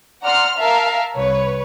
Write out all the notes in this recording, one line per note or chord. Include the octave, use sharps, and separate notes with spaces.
D5 F#5 A#5 C6 F6
A#4 E5 F5 A5
C2 B4 C#5